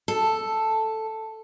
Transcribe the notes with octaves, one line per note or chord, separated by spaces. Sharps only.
A4